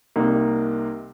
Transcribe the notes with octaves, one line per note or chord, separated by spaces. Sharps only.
C2 C3 G3 A#3 D#4